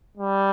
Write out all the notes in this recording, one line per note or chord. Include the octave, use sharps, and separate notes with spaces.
G3